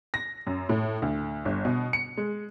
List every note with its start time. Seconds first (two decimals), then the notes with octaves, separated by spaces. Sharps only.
0.14 A#6
0.47 F#2
0.69 A2
1.02 D2
1.45 G1
1.65 B2
1.93 C#7
2.18 G#3